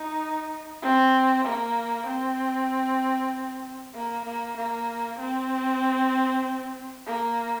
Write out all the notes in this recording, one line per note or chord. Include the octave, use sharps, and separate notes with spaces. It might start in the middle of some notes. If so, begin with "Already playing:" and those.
Already playing: D#4
C4
A#3
C4
A#3
A#3
A#3
C4
A#3